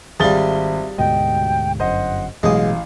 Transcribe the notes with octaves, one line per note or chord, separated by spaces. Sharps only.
G#1 G3 F4 G#4 E5 A6 G7
D2 G#2 B2 D#5 G5
G1 F#2 C5 D#5 F#5
A1 B2 F#3 G#3 F5 D#6